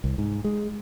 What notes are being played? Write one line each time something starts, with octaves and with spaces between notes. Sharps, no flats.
C2
G#2
G#3